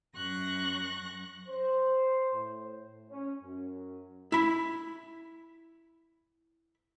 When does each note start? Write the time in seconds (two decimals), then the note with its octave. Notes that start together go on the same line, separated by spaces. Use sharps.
0.16 F#2 C#6 F#6 A#6
1.48 C5
2.34 A2
3.10 C#4
3.43 F#2
4.32 E4 B5